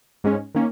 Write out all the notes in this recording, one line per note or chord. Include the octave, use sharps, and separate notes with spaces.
G#2 G#3 C#4
D#3 A#3 C#4